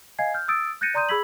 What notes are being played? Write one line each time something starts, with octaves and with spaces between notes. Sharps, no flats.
D#5 F5 G#5 G#6 C7
F6 G6
D#6 E6 A6 D7
F#6 G6 A6 A#6 C#7 D#7
D5 A#5 C6 D#6 G6 D#7
G#4 B5 E6 G#6 B6 F#7